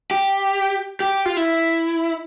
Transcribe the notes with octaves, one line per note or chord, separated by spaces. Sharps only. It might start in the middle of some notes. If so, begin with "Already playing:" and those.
G4
G4
F4
E4